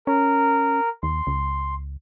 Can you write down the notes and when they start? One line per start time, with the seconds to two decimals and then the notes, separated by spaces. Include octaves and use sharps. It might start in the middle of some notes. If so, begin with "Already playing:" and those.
0.07 C#4 A#4
1.03 D#2 C6
1.27 C#2